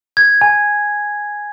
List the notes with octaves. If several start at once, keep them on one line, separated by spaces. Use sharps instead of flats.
G#6
G#5